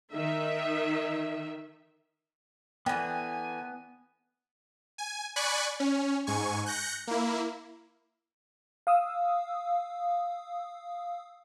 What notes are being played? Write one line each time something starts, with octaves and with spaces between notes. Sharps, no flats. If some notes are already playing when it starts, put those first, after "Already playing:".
D#3 E5
D3 E3 B3 G5 G#5
G#5
D5 G#5 B5 C#6 F#6
C#4
G#2 G#5 C#6
F#6 G6 A#6 C#7
A#3 E4
F5 D#6 E6